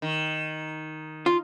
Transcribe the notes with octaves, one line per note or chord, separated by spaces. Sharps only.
D#3
F4